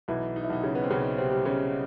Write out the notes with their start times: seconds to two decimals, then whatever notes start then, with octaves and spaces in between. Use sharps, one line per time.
0.08 B1 E3 E4
0.36 D#4
0.44 E4
0.50 B1 D#3 D#4
0.63 C#3 C#4
0.75 B3
0.84 C4
0.90 B1 C#3 C#4
1.18 C3 C4
1.31 G3
1.45 C#3 C#4